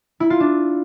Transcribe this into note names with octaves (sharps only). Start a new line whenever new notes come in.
E4
F4
D4